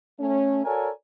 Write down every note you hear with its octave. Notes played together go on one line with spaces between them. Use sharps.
A3 C#4
F#4 A4 A#4 C#5 D5 G#5